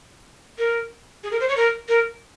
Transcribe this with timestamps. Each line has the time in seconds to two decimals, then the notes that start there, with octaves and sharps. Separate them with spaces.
0.58 A#4
1.24 G#4
1.31 A#4
1.40 C5
1.49 C#5
1.56 A#4
1.88 A#4